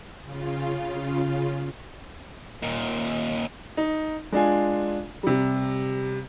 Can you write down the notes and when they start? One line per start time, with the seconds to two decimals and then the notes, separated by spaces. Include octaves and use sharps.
0.23 C#3 F4
2.62 D#2 A#2
3.77 D#4
4.32 G#3 D4 F4 G#5
5.23 C3 G3